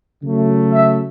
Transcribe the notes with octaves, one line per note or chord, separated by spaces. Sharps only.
C#3 F#3 A3
E5